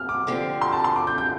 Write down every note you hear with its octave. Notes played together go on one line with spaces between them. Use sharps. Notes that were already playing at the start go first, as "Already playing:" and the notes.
Already playing: F6
D6
D3 F3 C4 G4
C6
A5
C6
D6
G6
G6